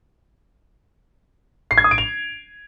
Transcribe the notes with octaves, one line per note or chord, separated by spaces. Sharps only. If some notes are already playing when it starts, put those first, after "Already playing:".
C7
G#6
D#6
D7
F7